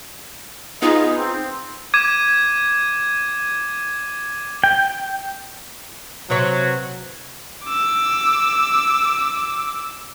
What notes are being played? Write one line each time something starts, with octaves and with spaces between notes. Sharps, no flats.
B3 D#4 F4 G#4 D#5
C4
D6 G#6 D#7
G5
C3 F#3 B4 C#5
D6 E6